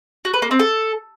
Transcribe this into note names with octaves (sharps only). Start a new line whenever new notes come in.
F#4
B4
A#3
C4
A4